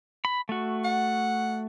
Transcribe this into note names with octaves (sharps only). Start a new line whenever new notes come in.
B5
A3 F#4
F#5